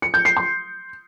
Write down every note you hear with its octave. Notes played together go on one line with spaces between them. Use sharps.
C#7
G6
C7
C6